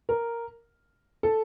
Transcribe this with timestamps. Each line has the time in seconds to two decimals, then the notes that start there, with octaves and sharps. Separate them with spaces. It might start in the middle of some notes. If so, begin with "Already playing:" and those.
0.09 A#4
1.23 A4